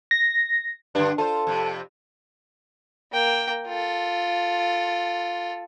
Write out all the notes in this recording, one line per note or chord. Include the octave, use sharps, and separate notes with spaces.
A#6
G2 D3 D4
F4 A4 C5
F2 C3
A#3 G5
F4 A4